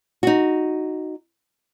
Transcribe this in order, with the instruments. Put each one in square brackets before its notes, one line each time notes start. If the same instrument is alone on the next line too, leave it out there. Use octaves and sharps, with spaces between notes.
[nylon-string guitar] D#4 F#4